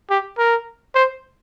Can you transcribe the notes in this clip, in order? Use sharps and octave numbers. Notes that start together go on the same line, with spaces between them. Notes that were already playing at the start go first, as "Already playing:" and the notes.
G4
A#4
C5